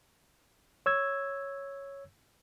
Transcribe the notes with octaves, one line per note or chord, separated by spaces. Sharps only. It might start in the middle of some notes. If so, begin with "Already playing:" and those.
C#5 E6 G#6